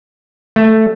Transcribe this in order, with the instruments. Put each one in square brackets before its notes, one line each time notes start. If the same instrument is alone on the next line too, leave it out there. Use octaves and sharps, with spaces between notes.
[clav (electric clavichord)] A3